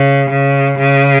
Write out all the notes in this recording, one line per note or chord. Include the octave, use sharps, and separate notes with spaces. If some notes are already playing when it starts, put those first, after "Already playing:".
Already playing: C#3
C#3
C#3